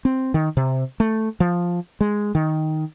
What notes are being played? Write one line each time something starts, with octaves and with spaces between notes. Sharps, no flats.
C4
D#3
C3
A3
F3
G#3
D#3